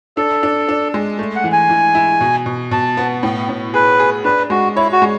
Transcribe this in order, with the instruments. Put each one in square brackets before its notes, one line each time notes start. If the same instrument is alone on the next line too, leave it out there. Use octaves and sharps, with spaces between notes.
[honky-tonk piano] D4 [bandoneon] A4
[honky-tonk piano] D4
D4
G#3
A3
[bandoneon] F#5
[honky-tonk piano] E3
[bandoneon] G#5
[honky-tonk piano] E3
E4
B2
B2
[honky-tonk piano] B2 [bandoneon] A5
[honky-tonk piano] B3
A2
A2
[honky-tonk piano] G#4 [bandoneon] B4
[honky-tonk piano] G#4
[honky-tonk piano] D4 [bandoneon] B4
[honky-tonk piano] G#3 [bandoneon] F#4
[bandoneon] E4 [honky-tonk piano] C#5
[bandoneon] F#4
[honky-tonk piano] G#3